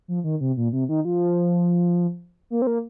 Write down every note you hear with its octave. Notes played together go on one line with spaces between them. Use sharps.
F3
D#3
C3
A#2
C3
D#3
F3
A#3
C4
A#3